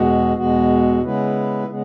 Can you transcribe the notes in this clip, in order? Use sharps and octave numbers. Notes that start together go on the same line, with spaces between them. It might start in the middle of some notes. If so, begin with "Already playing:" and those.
Already playing: E2 B2 G#3 B3 F#4
E2 B2 G#3 B3 F#4
C#3 G#3 B3 E4 B4
C#3 G#3 B3